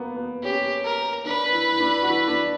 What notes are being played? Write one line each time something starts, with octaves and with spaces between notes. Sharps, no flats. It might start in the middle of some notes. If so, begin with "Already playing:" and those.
Already playing: A#3 B3
B3
C#4 G4
A#4
D4 B4
E4
E4
D4
F#4
E4
D4